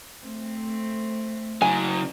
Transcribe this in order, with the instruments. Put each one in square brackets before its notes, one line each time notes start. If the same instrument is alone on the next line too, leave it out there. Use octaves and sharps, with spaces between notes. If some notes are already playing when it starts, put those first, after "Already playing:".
[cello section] A3 C4
[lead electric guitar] C#3 F#3 [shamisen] G#5